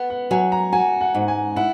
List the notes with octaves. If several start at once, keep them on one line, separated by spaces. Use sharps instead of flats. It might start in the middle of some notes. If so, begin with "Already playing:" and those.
Already playing: B3
F#5
F#3 G#5
A#5
F#4 G#5
F#5
G#2
G#5
E4 F#5